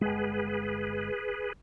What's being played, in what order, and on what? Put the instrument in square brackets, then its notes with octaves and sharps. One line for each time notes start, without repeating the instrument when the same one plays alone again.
[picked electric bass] G1 G#3 [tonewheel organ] G#4 B4